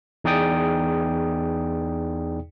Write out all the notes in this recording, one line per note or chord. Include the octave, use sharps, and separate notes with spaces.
E2 D#4 G#4 D5 G5 D#6